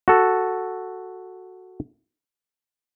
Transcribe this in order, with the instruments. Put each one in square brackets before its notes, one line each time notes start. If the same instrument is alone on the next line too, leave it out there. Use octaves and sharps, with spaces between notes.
[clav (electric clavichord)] F#4 A4